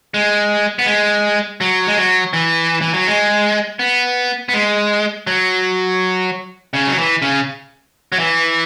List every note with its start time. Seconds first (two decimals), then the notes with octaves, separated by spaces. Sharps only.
0.14 G#3
0.79 B3
0.86 G#3
1.61 F#3
1.87 G#3
1.97 F#3
2.33 E3
2.81 E3
2.94 F#3
3.07 G#3
3.79 B3
4.49 B3
4.54 G#3
5.27 F#3
6.74 C#3
6.87 F#3
6.98 E3
7.22 C#3
8.12 F#3
8.19 E3